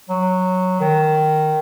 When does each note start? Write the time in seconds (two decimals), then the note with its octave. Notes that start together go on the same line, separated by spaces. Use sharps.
0.09 F#3
0.80 D#3